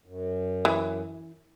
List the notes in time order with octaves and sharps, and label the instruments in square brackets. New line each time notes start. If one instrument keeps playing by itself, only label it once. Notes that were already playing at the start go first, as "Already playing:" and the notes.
[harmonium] F#2
[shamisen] E3